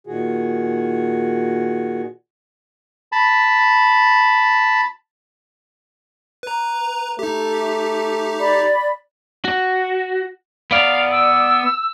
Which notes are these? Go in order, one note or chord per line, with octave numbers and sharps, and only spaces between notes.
A#2 D#3 F#4 G#4
A5 B5
B4 A#5
A3 D#4 G4
D5 B5
F#4
B3 D5 F5
E6